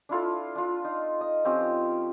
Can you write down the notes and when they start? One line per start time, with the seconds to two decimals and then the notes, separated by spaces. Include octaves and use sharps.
0.09 D4 E4 F4 A4
0.55 D4 F4
0.84 D#4
1.21 D#5
1.45 F3 C4 C#4 G4